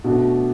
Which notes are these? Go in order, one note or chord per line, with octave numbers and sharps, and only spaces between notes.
B2 A3 D4 F#4